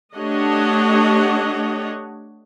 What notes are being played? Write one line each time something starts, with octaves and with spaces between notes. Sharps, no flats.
A3 D4 G4 C#5 D#5 F#5